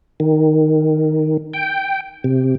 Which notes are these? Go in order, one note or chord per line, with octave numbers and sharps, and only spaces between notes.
D#3
G5
C3